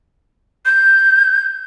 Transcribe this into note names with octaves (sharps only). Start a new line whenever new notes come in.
G6